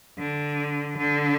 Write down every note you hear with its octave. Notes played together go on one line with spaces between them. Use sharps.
D3
D3